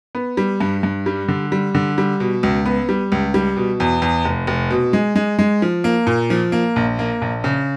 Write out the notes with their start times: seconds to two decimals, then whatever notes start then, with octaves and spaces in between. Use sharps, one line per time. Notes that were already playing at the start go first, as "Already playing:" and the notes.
0.15 B3
0.37 G3
0.61 G2
0.83 G2
1.06 G3
1.28 D3
1.52 G3
1.75 D3
1.98 G3
2.20 B2
2.43 C#2
2.66 B3
2.89 G3
3.12 C#2
3.34 G3
3.57 B2
3.80 E2
4.02 E2
4.25 F1
4.47 F1
4.70 B2
4.93 G#3
5.16 G#3
5.39 G#3
5.62 F3
5.84 A#3
6.07 A#2
6.30 F3
6.52 A#3
6.76 A#1
6.99 A#3
7.22 A#1
7.44 C#3